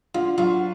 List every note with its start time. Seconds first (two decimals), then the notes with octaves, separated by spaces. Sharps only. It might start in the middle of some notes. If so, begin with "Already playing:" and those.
0.14 D3 F4
0.38 F#3 F4